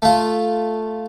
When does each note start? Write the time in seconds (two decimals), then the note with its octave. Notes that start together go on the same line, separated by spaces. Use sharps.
0.02 A3 F4